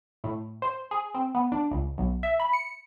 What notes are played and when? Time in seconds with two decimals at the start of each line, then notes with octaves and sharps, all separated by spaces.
0.24 A2
0.62 C5
0.91 G#4
1.15 C4
1.35 B3
1.52 D4
1.71 C#2
1.98 B1
2.23 E5
2.40 B5
2.53 C#7